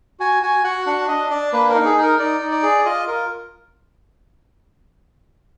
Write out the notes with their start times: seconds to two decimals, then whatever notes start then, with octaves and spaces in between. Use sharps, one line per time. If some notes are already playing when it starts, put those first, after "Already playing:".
0.20 F#4 G#5
0.42 F#4 G#5
0.64 F#4 F#5
0.86 D4 F#5
1.08 D4 D#5
1.30 D4 D5
1.53 A#3 B4
1.70 A#4
1.75 D#4
1.85 G#4
1.97 D#4
2.02 A#4
2.19 D#4 D5
2.40 D#4
2.51 D5
2.63 G#4
2.85 F4 D#5
3.07 F4 A#4